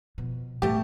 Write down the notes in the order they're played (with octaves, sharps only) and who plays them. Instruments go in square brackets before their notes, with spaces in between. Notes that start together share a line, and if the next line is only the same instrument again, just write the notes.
[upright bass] B2 F3
[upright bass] A2 [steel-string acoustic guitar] A3 A5 [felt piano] G4